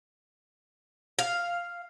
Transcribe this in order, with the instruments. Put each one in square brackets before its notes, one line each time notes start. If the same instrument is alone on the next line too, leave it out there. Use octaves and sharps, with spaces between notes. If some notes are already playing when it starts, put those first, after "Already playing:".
[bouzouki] F5